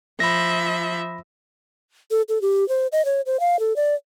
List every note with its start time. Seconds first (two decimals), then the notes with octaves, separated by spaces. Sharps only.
0.20 F3 E5 B5 A#6
2.11 A4
2.29 A4
2.42 G4
2.69 C5
2.92 D#5
3.05 C#5
3.26 C5
3.40 F5
3.60 A4
3.76 D5